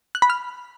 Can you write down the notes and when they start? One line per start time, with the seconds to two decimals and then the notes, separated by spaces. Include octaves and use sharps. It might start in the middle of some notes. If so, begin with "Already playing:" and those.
0.15 F#6
0.22 B5
0.30 F6